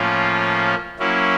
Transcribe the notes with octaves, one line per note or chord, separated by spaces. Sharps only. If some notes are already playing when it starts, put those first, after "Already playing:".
Already playing: A2 F3 A#3 C#4 F4
F#3 A#3 C#4 E4